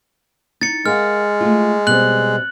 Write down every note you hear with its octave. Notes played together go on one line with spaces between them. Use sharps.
D#4 A6 C#7
G#3 A#4 F5 F#5 F6
A3 F4
B2 G3 C4 F#6 F#7